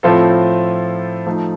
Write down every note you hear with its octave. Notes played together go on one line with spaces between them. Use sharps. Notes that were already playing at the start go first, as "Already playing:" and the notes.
A2 F3 C4 F4 A4
F3 A3 D#4